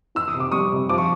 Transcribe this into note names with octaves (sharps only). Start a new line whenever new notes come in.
E3 E6
D#6
C3
D6
G3 C#6 D#6
C3
F3 D6
C#6